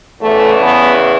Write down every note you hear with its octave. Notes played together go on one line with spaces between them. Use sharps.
E2 C#3 E3 A3
B3